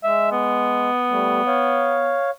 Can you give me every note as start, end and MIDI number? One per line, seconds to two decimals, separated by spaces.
0.04 0.90 56
0.04 0.27 76
0.32 2.19 59
1.10 1.42 55
1.10 1.42 57
1.47 2.30 73
1.47 2.30 77